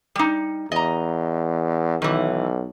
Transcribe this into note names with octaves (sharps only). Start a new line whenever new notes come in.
G3 D#4
E2 D#5 A#5
B1 D#3 E3